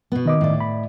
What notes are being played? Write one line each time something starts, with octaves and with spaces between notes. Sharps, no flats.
B2 B3
D#3 D#5 D6
A2 D5
B5